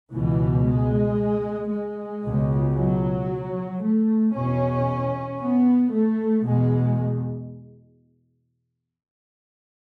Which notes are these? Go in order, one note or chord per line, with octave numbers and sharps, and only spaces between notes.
C#2 B2 E3
G#3
G#3
C#2 B2
F#3
A3
E2 B2 C#4
B3
A3
E2 B2 G#3